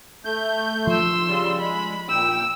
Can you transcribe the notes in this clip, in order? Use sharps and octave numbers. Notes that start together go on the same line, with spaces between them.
A3 G6
F3 C6 E6
C#3 G3
G#3 B5
A#2 G5 E6